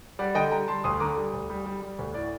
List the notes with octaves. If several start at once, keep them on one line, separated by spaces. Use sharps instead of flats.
G3 D5 F#5
D3 D#5 G5
G3 G5 A#5
G3 A5 C6
D2 C6 D#6
D3 A#5 D6
G3
D2
G3
G3
G3
D2
A2 D5